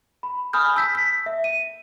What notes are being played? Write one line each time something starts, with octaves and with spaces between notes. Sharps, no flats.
B5
G#5 B5 D#6 F6 G6
A5 E6 G6 B6
B6
E5
D#7